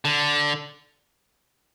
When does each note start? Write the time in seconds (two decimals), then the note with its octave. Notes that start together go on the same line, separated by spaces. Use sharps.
0.05 D3